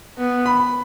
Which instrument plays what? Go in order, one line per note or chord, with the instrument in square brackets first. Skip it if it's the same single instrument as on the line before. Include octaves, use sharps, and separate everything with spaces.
[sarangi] B3
[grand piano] B5